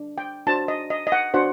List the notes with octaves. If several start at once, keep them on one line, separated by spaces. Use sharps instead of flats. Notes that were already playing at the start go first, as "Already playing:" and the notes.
Already playing: D4
G5
D4 F#4 C5 A5
D#5
D#5
D#5
F#5
D4 F#4 C5 F#5